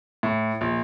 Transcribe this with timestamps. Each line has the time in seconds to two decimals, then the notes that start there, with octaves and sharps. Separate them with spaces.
0.23 A2
0.61 A#1